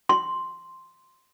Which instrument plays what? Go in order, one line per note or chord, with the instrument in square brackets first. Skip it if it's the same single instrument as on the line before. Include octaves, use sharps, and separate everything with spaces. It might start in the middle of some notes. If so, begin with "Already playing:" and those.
[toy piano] C6